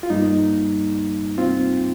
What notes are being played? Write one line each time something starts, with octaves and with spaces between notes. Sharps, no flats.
F4
G2 G3 A#3 D#4
C4 F4